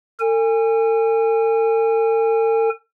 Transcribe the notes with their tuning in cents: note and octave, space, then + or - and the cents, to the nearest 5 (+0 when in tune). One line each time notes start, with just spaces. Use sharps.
A4 +45 G#5 -25